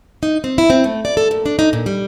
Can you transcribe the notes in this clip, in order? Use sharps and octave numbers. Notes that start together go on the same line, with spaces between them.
D#4
C4
E4
C4
A3
D5
A4
A#2
D4
D#4
A#2
G3